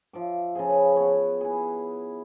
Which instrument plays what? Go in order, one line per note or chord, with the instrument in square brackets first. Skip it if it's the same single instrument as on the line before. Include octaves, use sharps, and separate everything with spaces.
[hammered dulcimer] F3 E5 D6
C#3 F3 G#4
B4
B3 C#5
E4 G#4